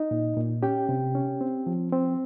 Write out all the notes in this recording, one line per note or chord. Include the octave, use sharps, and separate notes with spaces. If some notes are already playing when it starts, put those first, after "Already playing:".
Already playing: D#4 D#5
A#2
A#2
C#4 G4 G5
C3
C#4
C4
F3
C4